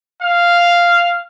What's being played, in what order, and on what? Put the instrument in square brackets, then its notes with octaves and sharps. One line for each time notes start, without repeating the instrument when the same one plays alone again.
[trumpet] F5